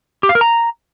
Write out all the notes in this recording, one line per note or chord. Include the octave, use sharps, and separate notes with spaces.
G4
F5
A#4
A#5